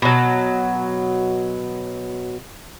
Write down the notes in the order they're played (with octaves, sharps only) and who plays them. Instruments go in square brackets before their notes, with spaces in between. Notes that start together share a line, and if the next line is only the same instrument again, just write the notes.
[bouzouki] B2 F#3